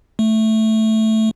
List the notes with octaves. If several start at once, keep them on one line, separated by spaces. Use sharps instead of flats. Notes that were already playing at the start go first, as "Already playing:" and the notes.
A3